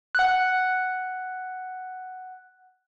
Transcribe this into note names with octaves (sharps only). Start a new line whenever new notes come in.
F#5 F#6